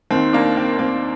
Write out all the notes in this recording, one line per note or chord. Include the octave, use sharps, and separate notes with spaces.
D#2 D#3 C4
A#3 D4
C4
D#2 D#3 C4